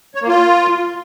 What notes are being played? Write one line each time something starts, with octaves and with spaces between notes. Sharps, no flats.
C#5
A#3
F4